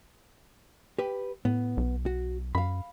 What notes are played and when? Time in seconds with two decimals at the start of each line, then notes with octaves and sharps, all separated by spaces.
0.98 G4 B4
1.45 A2 B3
1.77 B1
2.06 F#4
2.55 F#2 F5 B5